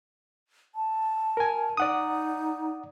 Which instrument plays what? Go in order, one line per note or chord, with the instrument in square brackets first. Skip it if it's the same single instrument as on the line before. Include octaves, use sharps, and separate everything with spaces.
[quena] A5
[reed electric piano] A#4 G#5
[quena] D#4 [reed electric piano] D5 F#5 D#6